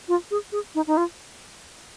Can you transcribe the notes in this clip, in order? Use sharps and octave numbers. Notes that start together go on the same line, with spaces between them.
F4
G#4
G#4
D#4
D#4
F4